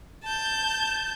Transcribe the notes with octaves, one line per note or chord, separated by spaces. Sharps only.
A5 G6